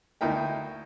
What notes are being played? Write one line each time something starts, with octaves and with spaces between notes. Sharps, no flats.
D2 A#3 D#4 E4 A#4 G5